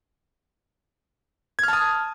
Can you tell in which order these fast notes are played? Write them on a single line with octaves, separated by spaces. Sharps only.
G#6 F6 A5 D#6